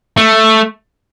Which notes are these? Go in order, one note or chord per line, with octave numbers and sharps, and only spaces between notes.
A3